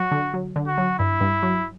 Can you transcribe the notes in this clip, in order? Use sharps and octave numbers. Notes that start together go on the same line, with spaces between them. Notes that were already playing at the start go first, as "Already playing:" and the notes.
Already playing: F#3 F#4
D3
F#3
D3
F#4
F#3
G2 E4
G2
F#3